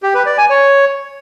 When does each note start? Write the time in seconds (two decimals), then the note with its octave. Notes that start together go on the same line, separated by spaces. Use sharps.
0.03 G4
0.14 B4
0.26 D5
0.38 G#5
0.50 C#5